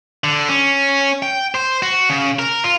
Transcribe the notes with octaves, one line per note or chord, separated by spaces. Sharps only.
D3
C#4
G5
C5
F#4
C#3
A#4
F4